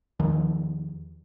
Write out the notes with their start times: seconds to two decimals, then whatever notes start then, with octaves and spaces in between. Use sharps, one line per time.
0.20 E2 D#3 F3